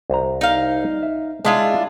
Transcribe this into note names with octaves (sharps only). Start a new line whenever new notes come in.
C2 C5 A#5
D#4 F5
E5
G#3 D4 E4 F4 D#5